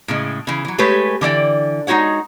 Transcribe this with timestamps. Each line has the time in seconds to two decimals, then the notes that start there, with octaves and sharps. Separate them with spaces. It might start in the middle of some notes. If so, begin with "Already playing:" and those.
0.08 A2 C#3 G#3
0.47 C#3 E3
0.65 E3 F#3
0.78 G#3 A3 G4 B4 C#5
1.21 D3 E3 D5 G5
1.87 G#3 D#4 F#4 C#5 F#5